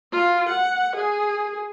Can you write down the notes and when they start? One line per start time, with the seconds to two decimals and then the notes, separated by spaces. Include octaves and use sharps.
0.12 F4
0.49 F#5
0.96 G#4